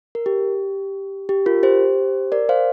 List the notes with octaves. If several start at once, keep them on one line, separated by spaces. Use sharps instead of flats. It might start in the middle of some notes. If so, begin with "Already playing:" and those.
A#4
G4
G4
F4 A#4
G4 C5
A#4 D5
C5 F5